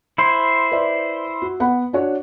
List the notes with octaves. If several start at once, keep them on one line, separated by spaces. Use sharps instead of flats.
E4 C5
B4 D5 E5
F#4
B3 F#5 B5
D4 F#4 C#5